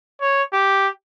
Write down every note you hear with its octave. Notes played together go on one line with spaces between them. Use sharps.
C#5
G4